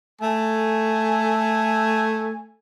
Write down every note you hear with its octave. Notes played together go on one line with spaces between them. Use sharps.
A3 G#5